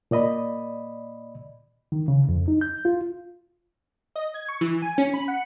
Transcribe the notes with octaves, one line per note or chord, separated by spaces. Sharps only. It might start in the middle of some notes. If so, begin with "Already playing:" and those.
A#2 D5 D#5 B5
D#3
C#3
F2
D#4
G6
F4
D#5
G#6
C#6
E3
G#5
C#4
B5
F#5